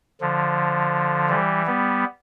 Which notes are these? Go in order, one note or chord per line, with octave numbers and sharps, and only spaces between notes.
D3 F3
E3 G3
G3 B3